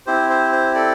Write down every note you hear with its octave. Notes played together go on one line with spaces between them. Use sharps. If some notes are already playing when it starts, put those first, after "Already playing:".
C4 E4 G4 C5
C5
C5
A4 D5